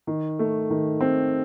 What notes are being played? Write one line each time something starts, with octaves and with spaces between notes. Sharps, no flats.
D#3
A3
D#3
C4